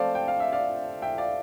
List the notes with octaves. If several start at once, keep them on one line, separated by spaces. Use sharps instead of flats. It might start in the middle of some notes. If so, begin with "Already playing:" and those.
Already playing: F3 A3 C4 A4 C5 D5 F5
G5
F5
E5
D5 F5
E5 G5
D5 F5